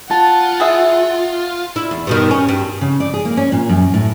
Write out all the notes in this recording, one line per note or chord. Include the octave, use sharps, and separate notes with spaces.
F4 F#5 A5
E4 G#4 E5
E4
E2
G2 B2 D#3
C#4
G2
C#3
D5
G#4
A#3
C#4
A#2
F#2
A2